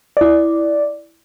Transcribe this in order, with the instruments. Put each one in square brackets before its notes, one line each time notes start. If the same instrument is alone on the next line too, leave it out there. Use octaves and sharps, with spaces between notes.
[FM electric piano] E4 D5